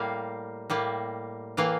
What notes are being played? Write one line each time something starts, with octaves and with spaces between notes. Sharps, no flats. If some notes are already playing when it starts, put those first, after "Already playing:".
Already playing: A2 G3 A#3 F5
A2 G3 A#3
A2 E3 A#3 F5